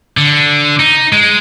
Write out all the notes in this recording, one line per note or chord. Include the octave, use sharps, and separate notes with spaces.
D3
D#4
G#3